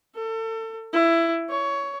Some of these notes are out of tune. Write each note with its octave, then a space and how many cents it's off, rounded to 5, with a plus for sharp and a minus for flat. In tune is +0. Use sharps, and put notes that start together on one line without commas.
A4 +30
E4 +15
C#5 +15